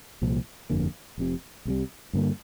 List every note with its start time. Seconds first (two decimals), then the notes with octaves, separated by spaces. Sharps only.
0.22 C2 A#2 F3
0.70 G1 F2 D3 A#3
1.18 F1 F2 C3
1.65 C2 C3 G3
2.13 G2 D3 A#3